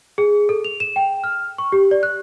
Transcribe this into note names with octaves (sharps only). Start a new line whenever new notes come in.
G#4
A4
F7
E7
G5
F6
C#6
G4
D5
F#6